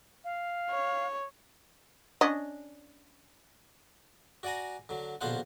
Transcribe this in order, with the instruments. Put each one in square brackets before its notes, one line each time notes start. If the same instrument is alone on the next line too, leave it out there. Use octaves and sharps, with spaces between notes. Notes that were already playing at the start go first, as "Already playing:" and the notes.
[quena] F5
[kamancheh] C#5
[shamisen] C#4 D4 D#5
[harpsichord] F#4 D5 F#5 G#5 A#5
D3 F#3
A#1 B2 D3 F4 C5 F#5